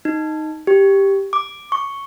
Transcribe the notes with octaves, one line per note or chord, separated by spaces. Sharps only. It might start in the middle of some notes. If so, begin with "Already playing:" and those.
D#4
G4
D6
C#6